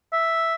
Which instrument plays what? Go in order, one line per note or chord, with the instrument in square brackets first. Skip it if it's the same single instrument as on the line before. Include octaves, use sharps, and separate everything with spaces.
[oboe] E5